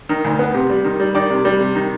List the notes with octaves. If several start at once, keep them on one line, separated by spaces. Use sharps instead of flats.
D#3
D2
B3
C3
G3
D#3
G3
D#3 D5
C3
G3
C3
D#3